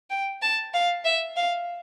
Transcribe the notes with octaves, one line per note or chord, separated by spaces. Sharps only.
G5
A5
F5
E5
F5